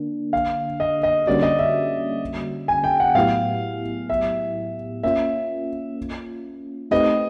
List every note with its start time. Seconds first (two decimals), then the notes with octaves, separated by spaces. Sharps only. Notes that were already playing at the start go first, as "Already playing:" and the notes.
Already playing: D3 A#3 D4
0.33 F5
0.80 D#5
1.03 D#5
1.27 D3 G3 A#3 C#4 F#4 D5
1.43 D#5
1.59 E5
2.68 G#5
2.84 G5
3.00 F#5
3.15 A2 F#3 B3 E4 G4 F5
4.09 E5
5.03 A#3 C#4 F4 E5
6.91 A3 C4 D#4 G4 B4 D#5